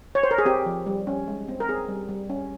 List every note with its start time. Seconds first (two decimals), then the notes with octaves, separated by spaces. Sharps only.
0.15 C#5
0.23 C5
0.31 A#4
0.38 G#4
0.45 C4 G4
0.66 F3
0.86 G3
1.07 C#4
1.27 G#3
1.49 C4
1.60 A#4
1.68 C4 G#4
1.88 G3
2.09 G3
2.30 C#4